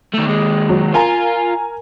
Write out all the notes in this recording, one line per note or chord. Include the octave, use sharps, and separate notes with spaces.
D#3 A3
D#2 G#3
F#3
F4 A#4 G#5 A#5